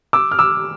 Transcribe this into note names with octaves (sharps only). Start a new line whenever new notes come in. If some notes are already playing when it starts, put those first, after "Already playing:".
D6 E6
F6
D6 E6